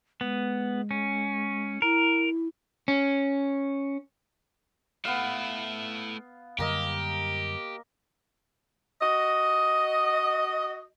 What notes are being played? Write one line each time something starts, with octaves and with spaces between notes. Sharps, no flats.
G#3 B3
C#4
E4 A#4
C#4
A3 B3 E4 F5
F#2 D3 G3 A#3 G4 A#4 D#5
F#4 D#5